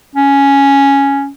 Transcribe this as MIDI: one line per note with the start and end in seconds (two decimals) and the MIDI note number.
0.15 1.30 61